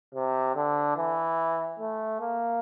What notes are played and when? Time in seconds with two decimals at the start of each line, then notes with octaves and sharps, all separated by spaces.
0.15 C3
0.56 D3
0.97 E3
1.79 A3
2.21 A#3